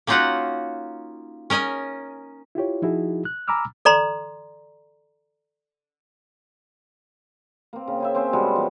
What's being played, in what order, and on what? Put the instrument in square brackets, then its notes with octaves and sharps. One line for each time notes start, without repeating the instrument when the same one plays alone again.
[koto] A#3 C#4 D#4 F4 F#4 F#5
C#4 A#4 D#5 G#5
[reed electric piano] E4 F4 G4 C#5
F3 D#4 E4 F#4 G#4
F#6
G#5 A#5 B5 D6 E6 F6
[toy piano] A4 D5 A#5 C6
[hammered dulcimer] A#3 C4
C#3
G#4 C5 E5
C4 C#4 C5
B2 G3 G#3
F3